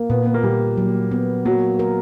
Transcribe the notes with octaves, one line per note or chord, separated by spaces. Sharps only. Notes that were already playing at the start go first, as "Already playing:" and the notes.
Already playing: A#3
A#2 B3
B3
A#3
A#2 G3
F#3
B3
F#3 A#3
A#4